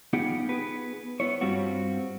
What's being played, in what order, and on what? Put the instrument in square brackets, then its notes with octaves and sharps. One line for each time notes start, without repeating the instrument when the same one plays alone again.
[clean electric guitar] B3 D#4 F4 G4 G#4 F#5
B3 G#4 B4
B3 E4 C#5
G2 G3 C4 F4 F#4